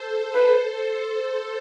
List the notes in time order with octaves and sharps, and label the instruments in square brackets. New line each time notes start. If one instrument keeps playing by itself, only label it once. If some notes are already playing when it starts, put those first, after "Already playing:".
Already playing: [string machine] A4 C5
[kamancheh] B4